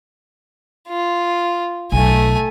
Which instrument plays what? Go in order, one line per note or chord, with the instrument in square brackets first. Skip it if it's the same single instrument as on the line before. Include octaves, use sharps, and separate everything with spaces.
[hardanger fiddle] F4
[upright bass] B1 [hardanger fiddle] A3 G#5